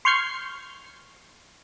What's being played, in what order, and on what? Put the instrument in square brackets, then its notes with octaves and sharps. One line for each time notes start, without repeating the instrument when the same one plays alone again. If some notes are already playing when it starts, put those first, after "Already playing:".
[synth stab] C6 C#6 F6 G6 G#6 C7